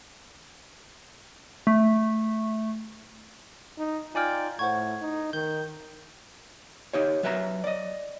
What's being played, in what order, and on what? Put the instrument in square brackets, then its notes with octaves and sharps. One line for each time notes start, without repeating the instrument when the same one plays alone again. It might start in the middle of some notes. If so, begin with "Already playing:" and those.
[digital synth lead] A3
[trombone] D#4
[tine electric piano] D#4 D5 G5 [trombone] F4 [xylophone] G#5 F6 G#6
[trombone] A2 [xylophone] C5 F#5 C#6 [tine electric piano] G#6
[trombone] D#4
[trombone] D#3 [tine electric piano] G6
[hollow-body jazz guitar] D#4 G4 C#5
F#3 B4 E5 G#5 A#5
D5 D#5